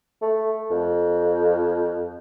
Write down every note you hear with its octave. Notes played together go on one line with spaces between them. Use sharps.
A3
F2